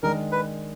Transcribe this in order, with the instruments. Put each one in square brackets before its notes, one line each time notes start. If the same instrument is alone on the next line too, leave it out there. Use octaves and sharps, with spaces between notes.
[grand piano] D#3 G#3 D4 [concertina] A#4
[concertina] B4